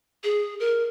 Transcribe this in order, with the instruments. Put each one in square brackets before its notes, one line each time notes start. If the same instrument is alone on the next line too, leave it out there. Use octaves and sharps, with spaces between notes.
[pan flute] G#4
A#4